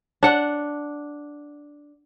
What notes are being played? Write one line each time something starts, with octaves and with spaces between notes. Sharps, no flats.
D4 F#5